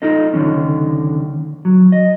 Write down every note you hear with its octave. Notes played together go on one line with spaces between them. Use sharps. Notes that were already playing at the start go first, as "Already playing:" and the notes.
D#4 F4 A4 D#5
C#2 D3 D#3 F#3 C#4
F#3
D#5